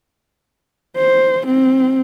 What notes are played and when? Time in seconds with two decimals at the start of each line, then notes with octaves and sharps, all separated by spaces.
0.97 C5
1.46 C4